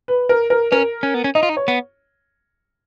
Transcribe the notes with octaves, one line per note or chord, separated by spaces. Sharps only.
B4
A#4
A#4
C#4 A#4
C#4
B3
C#4
D#4 D#5
F4
D#4
C#5
B3